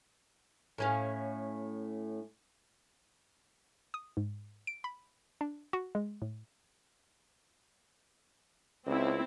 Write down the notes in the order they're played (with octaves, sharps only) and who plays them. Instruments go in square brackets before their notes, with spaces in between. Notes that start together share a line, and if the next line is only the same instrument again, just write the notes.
[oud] A2 C#4 F5
[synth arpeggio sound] D#6
G#2
D7
B5
D4
F#4
G#3
A2
[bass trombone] C#2 [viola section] C4 E4